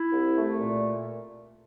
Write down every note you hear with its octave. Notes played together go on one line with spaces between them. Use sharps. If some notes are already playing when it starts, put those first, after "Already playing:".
Already playing: E4
C2
A3
A#2